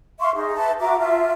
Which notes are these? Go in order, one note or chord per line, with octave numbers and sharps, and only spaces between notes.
E5 F5 C6 C#6
D#4 G#4
B4 E5 A5
F#4 E5 A#5 D6
F4 E5